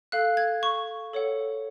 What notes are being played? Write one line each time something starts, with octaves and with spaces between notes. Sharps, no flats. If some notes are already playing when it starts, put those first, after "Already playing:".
A4 F5 F#6
G#6
C#6
A4 C#5 F#5